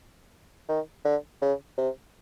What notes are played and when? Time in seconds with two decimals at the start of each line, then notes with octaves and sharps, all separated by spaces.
0.69 D#3
1.05 D3
1.42 C#3
1.78 C3